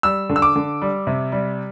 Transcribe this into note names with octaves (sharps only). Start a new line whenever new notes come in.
G3 E6
D3
E6
D6
D3
G3
C3
G3